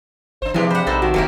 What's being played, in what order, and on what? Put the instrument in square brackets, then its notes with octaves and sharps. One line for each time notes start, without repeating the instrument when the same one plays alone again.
[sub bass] G#1 [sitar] D4 C5
[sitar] F#2 D4 G4 [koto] C3 G#3 [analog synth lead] E3 [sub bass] F3
[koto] C5 F#5 [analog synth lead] B5
[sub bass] A#1 [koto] D#4 A4 C5
[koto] D#3 [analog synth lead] F#4
[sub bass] F1 [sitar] D#3 E4 [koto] F#3 A#3 G4